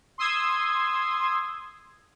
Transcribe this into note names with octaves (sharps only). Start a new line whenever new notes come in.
C6 D#6 E6 G#6